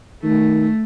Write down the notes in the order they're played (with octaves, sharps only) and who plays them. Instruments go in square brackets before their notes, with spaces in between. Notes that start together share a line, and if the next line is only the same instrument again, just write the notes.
[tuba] D#3 [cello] A3